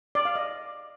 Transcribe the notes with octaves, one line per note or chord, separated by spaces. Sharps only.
D5
F5
D#5